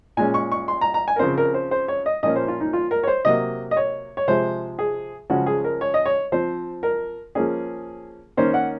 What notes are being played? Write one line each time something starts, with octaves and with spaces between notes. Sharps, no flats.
A#2 G#3 C#4 G#5
C#6
C#6
C6
A#5
A#5
G#5
A#4
C#3 F3 C4 C5
A#4
C5
C5
C#5
D#5
A#2 F3 A#3 C#4 D#5
C5
F4
D#4
F4
A#4
C#5
C5
C3 F#3 A#3 D#5
D#5
C#5
C#5
C3 F3 G#3 C5
G#4
C#3 F3 G#3 C#4 F#4
G#4
A#4
C#5
D#5
C#5
F3 C4 C5
A#4
F3 A#3 C#4 G#4
D#3 A#3 C#4 C5
F#5